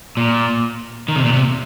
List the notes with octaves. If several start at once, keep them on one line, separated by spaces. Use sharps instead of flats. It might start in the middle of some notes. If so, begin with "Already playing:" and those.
A#2
D#3
C3
A#2
C3